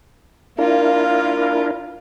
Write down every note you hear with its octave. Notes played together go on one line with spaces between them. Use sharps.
A#3 D4 E4 F4 A#4